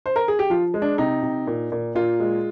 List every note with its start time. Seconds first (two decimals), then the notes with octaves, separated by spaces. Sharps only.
0.06 C5
0.16 A#4
0.28 G#4
0.39 G4
0.50 F3 F4
0.74 G#3
0.82 D4
0.98 C3 D#4
1.23 C3
1.47 A#2
1.72 A#2
1.95 A#2 F4
2.20 G#3